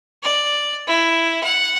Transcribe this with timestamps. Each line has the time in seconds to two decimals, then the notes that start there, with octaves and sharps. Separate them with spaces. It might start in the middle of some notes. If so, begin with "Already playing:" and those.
0.23 D5
0.87 E4
1.43 F#5